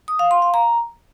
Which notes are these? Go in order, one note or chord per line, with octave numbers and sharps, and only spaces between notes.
D#6
F5
C6
F5
A#5